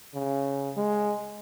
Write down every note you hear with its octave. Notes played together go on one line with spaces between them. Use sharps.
C#3
G#3